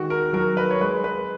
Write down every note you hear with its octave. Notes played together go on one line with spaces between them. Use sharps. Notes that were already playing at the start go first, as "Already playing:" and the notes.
Already playing: D#3 G#3 F#4
A#4
F#3 A#4
B4
C#5
G#3 B4
B4